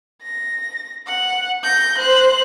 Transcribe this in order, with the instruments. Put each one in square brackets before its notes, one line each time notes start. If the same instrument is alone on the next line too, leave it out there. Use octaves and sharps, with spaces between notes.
[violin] A#6
F#5
G6 A#6
C5 F#6